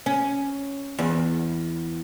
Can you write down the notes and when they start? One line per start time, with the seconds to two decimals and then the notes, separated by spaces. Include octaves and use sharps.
0.06 C#4
0.99 E2